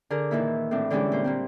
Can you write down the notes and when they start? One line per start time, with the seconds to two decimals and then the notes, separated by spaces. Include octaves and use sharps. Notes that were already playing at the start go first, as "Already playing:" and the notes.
0.10 D3 G#4 A#4
0.31 A#2 D#3 E3 A#3 E4
0.71 A2 E3 C4 D4
0.90 D3 E3 G3 G#3 C#4 D4
1.12 A#2 C5
1.24 A#2 A#3 C4